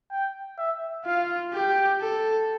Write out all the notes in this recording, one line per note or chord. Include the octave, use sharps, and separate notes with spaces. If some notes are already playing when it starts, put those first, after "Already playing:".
G5
E5
F4 F5
G4 G5
A4